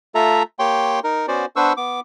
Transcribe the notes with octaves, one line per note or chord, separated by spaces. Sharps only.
A3 F4 A4 E5 A#5
A#3 G4 C#5 G5 C6
D#4 A#4
B3 C#4 F#4 C5 D5
B3 D4 B4 C5 C#6 E6
B3 D6